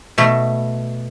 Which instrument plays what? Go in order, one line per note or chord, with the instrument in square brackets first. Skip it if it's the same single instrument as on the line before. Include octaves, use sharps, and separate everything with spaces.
[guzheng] B2 A3